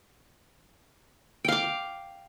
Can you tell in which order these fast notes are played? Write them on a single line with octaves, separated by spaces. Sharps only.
G5 F5 D6